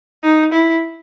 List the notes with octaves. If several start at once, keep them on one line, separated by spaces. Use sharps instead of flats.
D#4
E4